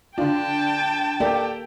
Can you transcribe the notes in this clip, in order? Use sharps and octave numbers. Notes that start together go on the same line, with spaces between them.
D3 D4 F4 G5 A5
A#3 G4 A4 D5